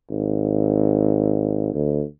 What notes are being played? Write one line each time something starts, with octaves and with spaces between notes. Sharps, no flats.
G#1
D2